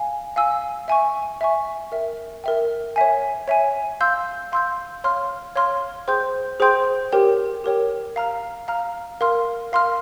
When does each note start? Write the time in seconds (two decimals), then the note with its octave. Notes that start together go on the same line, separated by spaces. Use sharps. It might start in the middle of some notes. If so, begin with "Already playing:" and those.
Already playing: F5 G#5
0.36 F5 G#5 E6
0.88 E5 G#5 C#6
1.41 E5 G#5 C#6
1.92 A#4 E5 G5
2.44 A#4 E5 G5
2.96 C#5 E5 G#5
3.48 C#5 E5 G#5
4.01 F5 C6 E6 G6
4.52 F5 C6 E6 G6
5.04 C#5 F5 C6 F6
5.56 C#5 F5 C6 F6
6.08 G#4 C5 G5 C6 G6
6.60 G#4 C5 G5 C6 G6
7.12 G4 A#4 C#5 G5
7.64 G4 A#4 C#5 G5
8.16 F5 A#5 F6
8.68 F5 A#5 F6
9.21 A#4 F5 C6 F6
9.72 A#4 F5 C6 F6